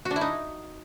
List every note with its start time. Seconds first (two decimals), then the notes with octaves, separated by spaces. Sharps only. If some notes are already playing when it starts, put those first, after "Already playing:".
0.05 F#4
0.11 D4
0.16 E4
0.21 D#4